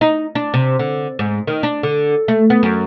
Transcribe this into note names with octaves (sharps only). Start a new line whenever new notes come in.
D#4
D4
C3
D3
G#2
D#3
D4
D3
A3
B3
F#2